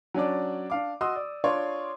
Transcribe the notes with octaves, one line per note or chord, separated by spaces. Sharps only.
F#3 C#4 D4 D5
D4 F5 D6
F#4 D#5 C6 D#6 E6
D5
D4 F4 C#5 D5 C6 C#6